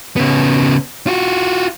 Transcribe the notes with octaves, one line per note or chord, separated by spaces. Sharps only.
C#3 B3
F4 F#4